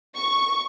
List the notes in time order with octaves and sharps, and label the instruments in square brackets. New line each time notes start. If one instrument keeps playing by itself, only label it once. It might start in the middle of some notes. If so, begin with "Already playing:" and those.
[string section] C#6